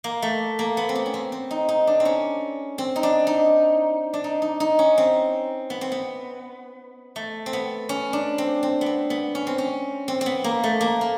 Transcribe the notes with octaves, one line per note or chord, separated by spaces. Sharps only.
A#3
A3
A#3
B3
C4
B3
C#4
C4
C4
D#4
D#4
D4
C4
C#4
C4
D#4
D4
D#4
D4
D#4
D#4
D#4
C#4
C4
B3
C4
B3
A3
C4
B3
C#4
D4
C4
C4
B3
C4
B3
C#4
C4
C#4
C4
C4
B3
A#3
A3
A#3
A#3